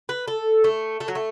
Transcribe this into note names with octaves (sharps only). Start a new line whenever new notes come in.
B4
A4
A3
A3
F#3
A3